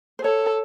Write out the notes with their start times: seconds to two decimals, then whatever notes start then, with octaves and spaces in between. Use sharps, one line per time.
0.19 C5
0.23 A4 C#5